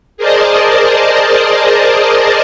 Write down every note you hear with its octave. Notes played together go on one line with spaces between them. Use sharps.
G#4 A#4 C5 D5 D#5 A5